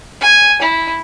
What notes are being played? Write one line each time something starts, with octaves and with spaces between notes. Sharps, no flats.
G#5
E4